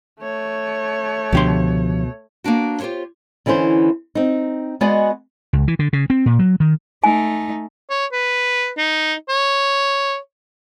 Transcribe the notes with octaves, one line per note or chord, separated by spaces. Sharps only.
A3 C#5
C#2 B2 D3 F3 D4 G4 C6
A#3 B3 D4 F#4
F4 G4 A4 C5 C#5
D3 E3 C#4 E4 C5
C4 D#4
G#3 B3 F#4 D5 D#5 G#5
C#2
E3
D3
C#3
C4
A#2
F#3
D#3
A3 D#4 G#5
C#5
B4
D#4
C#5